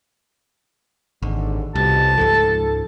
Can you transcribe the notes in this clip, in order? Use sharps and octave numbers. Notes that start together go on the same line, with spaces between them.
G#1 D#2 G#2 D3
C2 F2 B2 G3 A5
C#2 G#2 F3 A4